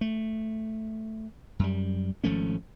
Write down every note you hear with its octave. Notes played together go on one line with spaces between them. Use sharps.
A3
F#2 G3
G#1 F3 A3 C#4